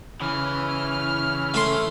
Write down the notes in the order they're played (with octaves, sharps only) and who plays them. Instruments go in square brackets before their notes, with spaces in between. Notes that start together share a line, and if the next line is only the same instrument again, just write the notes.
[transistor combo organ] C#3 [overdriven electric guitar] E3 [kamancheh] F6
[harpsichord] A3 A4 C6